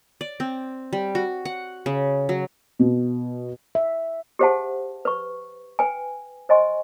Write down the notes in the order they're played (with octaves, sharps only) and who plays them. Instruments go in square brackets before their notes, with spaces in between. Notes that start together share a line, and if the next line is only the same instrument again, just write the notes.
[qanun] D5
C4
G3
F#4
F#5
C#3
F#3
[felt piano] B2
[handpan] E5
[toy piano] G4 G#4 C5 E5 F#5 A5
B4 C#6
B4 G5 G#5
C5 D#5 G#5 C6 C#6